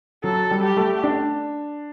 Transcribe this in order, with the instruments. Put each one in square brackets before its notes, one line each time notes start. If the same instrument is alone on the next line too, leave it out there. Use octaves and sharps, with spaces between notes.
[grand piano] F#3 [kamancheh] A4
[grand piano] G3
[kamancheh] G4
[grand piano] A3
D4